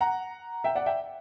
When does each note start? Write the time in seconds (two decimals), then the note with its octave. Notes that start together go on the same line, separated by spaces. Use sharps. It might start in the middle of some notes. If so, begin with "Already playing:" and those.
0.01 F#5 A#5
0.64 E5 G5
0.75 D5 F#5
0.86 E5 G5